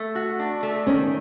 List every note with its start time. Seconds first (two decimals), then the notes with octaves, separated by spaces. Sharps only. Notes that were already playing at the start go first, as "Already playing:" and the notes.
Already playing: A3
0.15 F#4
0.39 D4
0.63 A3
0.87 D#3 C#4